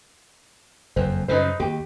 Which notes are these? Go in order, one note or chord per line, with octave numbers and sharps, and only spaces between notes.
F#1 F2 C5
F#2 C#3 D#4 B4 C5
D#2 G4